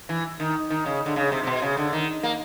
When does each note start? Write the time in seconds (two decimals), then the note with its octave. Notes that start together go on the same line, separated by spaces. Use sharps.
0.09 E3
0.40 D#3
0.70 D#3
0.86 C#3
1.06 D3
1.16 C#3
1.32 C3
1.43 C3
1.47 B2
1.62 C#3
1.77 D3
1.93 D#3
2.23 A#3